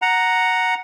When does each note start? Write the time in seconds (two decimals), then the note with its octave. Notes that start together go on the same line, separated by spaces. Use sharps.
0.02 F#5 A#5